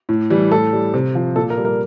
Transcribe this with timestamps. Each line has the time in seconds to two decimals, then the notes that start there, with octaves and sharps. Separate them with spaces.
0.09 A2
0.30 E3 G3
0.51 A2 A4
0.73 G3
0.94 C3
1.15 F3
1.36 A#2 A4
1.50 A#4
1.58 G3
1.65 A#4